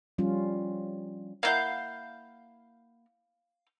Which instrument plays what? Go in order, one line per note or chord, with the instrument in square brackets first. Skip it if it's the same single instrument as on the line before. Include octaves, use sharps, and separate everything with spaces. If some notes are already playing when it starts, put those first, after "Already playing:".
[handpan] F3 G3 C#4 F4
[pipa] A#3 E4 F#5 [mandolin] F5 G6